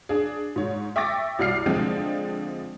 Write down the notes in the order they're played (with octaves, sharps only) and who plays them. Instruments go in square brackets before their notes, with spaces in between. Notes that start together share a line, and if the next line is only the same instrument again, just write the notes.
[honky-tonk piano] D4 G#4
G#2 C#5
E5 G5 C#6 D6 A6 A#6
C2 F#4 D5 F6 C7
D3 F3 G#3 C4 D4